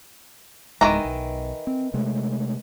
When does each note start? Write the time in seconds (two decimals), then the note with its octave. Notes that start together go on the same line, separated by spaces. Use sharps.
0.81 D1 C2 D#3 E3 G#3 A#5
1.05 B1
1.67 C4
1.94 C3 G#3 A3